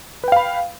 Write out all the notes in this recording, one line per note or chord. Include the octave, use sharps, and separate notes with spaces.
B4 F5 G5 B5